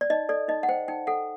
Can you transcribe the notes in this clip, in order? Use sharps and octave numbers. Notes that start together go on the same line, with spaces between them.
D5
D#4 D#5
A4 D5
D#4 D#5
F#5
C5 G5
D#4 G5
A4 F#5